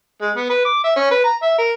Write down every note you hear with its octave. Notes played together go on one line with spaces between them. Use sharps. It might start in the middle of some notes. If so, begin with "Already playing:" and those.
G#3
B3
B4
D6
E5
C#4
B4
A#5
E5
A#4